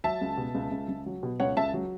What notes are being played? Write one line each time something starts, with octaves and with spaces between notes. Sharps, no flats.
F#3 E5 A5
C#2
B2
C#2
C#2
C#2
F#3
B2
C#2 C#5 F#5
C#2 E5 A5
F#3